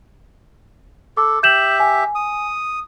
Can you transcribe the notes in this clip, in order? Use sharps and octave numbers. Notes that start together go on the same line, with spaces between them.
A4 D6
G4 E5 G6 E7 F#7
G#5
D#6